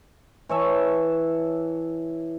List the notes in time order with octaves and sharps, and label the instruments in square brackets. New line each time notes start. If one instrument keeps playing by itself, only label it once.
[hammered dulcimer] E3 C#5 E5 A5